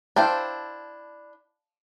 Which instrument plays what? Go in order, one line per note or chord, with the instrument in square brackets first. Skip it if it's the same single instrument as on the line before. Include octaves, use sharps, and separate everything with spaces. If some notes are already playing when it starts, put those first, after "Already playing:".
[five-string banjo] D4 E4 C5 [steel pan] F5 G5 A5